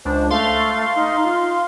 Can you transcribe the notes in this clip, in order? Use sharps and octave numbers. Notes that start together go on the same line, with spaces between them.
C#2 D4 C5
A3 F5 C6
D#4
F4